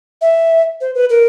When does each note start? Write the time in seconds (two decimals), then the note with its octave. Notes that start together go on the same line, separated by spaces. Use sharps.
0.21 E5
0.81 C5
0.95 B4
1.10 A#4